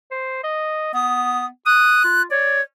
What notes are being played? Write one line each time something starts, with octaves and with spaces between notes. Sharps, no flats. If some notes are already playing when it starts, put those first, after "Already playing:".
C5
D#5
B3 D#6
D#6 F#6
F4
C#5 D5